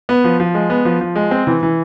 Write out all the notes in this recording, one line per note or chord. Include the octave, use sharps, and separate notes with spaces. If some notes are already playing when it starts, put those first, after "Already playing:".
B3
F3
F3
G#3
B3
F3
F3
G#3
C4
E3
E3